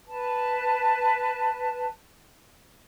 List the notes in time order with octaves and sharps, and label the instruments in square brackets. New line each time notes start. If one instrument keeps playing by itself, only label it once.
[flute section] B4 A5